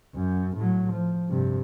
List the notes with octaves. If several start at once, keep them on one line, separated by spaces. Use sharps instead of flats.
F#2
A2 F#3
F3
G2 C3